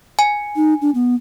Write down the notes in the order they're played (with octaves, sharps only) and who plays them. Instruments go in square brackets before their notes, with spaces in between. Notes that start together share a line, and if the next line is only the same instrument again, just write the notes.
[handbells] G#5
[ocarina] D#4
D4
B3